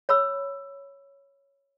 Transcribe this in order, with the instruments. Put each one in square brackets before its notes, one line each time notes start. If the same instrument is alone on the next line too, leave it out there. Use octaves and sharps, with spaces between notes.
[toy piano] C#5 B5 E6